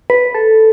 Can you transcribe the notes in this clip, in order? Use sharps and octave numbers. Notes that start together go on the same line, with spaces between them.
B4
A4